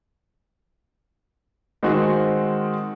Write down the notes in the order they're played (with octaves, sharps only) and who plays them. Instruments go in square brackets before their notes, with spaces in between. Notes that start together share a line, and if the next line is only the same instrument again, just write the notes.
[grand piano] D#3 G#3 C4 F#4